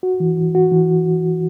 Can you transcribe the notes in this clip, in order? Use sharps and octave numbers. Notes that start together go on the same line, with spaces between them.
F#4
E3
E3
F#4
E3